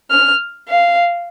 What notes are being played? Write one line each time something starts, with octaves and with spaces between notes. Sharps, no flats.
F6
F5